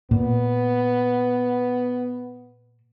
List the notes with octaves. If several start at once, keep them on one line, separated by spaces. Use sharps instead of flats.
A#2 B3